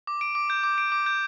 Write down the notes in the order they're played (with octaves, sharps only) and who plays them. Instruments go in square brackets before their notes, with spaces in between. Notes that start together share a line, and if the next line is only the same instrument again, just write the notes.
[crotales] D6
D7
D6
G6
D6
D7
D6
G6